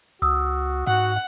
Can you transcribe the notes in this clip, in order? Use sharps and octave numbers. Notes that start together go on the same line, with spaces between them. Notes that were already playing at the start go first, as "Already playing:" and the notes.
C#2 F#4 D#6 E6
G#2 F#4 F#5